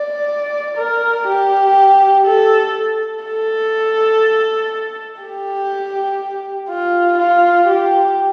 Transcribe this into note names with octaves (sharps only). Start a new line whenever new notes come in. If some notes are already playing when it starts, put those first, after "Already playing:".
Already playing: D5
A#4
G4
A4
A4
G4
F4
F4
G4